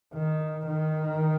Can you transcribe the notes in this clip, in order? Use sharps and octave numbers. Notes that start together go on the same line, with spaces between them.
D#3
D#3